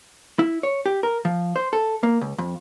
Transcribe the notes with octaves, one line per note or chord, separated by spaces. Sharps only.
E4
C#5
G4
A#4
F3
C5
A4
A#3
C#2
F2